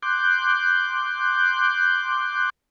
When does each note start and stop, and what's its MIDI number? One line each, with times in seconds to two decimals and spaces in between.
0.02 2.50 84
0.02 2.50 86
0.02 2.50 90
0.02 2.50 91